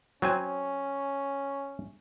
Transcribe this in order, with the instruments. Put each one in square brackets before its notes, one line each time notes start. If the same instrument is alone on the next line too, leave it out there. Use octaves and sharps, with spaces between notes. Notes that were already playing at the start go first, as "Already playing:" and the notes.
[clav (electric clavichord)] F#3 C4 G#5 [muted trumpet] C#4